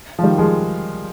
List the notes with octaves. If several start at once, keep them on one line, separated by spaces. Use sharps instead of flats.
F3
D#3 G3
F3 G#3